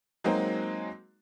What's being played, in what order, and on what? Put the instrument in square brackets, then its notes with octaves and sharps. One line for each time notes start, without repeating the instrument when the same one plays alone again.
[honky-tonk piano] F#3 G#3 A#3 C4 D#4 F#4